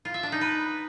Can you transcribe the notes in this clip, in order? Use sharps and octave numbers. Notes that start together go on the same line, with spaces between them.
F4
E5
D4
D#4
B4